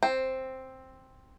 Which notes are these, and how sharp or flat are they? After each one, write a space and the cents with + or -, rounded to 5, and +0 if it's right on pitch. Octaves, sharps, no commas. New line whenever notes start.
C4 +5